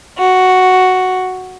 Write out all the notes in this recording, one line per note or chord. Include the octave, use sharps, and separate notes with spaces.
F#4